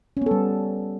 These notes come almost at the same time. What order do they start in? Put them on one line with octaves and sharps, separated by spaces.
C#4 B3 A4 G3